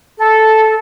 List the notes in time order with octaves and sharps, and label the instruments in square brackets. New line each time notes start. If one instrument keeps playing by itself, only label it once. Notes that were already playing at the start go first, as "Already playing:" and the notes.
[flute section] A4